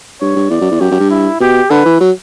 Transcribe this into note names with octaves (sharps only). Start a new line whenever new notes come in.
G2 C#5
G2
E2 D5
F#2
E2
F#2 G4
F#2
G2
E4
B2 G4
D3 B4
E3
F#3